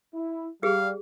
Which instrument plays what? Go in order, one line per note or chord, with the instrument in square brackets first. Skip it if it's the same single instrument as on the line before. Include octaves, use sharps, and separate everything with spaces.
[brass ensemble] E4
[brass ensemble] G3 [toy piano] G4 G#4 [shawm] F5